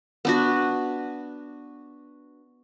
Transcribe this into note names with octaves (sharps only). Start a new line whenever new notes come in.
B3 D4 F#4